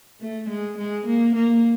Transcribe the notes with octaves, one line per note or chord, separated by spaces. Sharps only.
A3
G#3
G#3
A#3
A#3